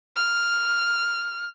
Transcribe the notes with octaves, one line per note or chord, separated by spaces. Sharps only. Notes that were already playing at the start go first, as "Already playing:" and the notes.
F6